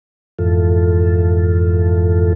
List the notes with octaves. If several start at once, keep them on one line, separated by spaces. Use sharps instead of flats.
F2 G#2 E3 F4 A4